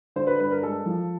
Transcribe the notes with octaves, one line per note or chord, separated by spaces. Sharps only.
D3 C5
B4
G2 B4
A#4
G#3 A4
F3